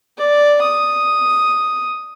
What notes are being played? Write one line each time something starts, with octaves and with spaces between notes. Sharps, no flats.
D5
D#6